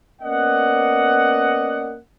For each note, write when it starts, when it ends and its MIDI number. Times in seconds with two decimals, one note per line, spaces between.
0.21 1.95 58
0.21 1.95 59
0.21 1.95 61
0.21 1.95 74
0.21 1.95 75
0.21 1.95 78